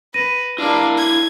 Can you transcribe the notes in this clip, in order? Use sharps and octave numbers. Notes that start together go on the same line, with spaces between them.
B4 A#6 D#7
A#3 D4 E4 F5
G#6